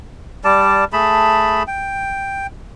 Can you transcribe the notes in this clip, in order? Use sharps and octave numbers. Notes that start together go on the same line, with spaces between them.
G3 D5 A5
A3 G#4 A5 B5
G5